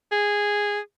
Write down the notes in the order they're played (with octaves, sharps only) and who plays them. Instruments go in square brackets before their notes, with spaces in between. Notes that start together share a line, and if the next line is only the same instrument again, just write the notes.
[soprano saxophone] G#4